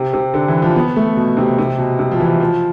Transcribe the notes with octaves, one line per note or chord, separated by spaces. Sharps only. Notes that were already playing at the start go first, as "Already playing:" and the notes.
Already playing: C3
C3
D3
E3
F3
B3
A3
B2
C3
C3
B2
C3
F3
E3
F3